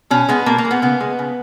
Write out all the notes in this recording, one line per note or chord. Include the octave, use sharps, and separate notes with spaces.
B2 C#4
G#3 B3
B2 A#3
A#3
G#3
B3
C#3 B3
G#3
C#3